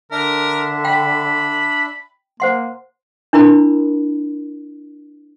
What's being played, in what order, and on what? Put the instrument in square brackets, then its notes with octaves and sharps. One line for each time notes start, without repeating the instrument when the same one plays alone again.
[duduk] D3 [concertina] D4 E5 [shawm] A#4
[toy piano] G5 [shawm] B5
[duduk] A#3 [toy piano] C5 F#5 C6
[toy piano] D4 E4 A#4 B5